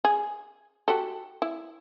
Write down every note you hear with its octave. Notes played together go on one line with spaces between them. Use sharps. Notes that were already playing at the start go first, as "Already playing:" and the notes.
G#4
F#4 G4 A4
E4